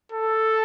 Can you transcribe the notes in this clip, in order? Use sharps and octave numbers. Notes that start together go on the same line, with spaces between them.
A4